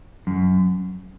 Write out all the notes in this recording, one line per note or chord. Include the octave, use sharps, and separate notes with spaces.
F#2